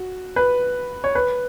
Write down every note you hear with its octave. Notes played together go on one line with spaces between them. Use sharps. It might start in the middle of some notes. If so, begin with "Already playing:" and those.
Already playing: F#4
B4
C#5
B4